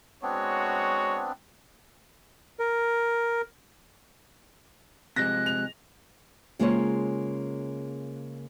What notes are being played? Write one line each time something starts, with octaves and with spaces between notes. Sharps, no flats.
G#3 B3 C4 D4 F#4 C#5
A#4
C3 F3 G#3 F#6 A#6
F7
C#3 G#3 A#3 F4 C5 C#5